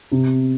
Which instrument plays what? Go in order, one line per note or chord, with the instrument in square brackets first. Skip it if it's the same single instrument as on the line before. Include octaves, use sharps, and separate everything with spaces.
[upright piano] C3